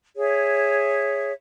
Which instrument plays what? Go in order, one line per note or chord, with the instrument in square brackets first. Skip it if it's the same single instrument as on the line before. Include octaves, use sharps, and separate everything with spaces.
[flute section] G#4 C#5 E5